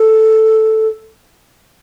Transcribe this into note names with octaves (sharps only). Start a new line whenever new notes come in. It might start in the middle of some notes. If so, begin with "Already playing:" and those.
Already playing: A4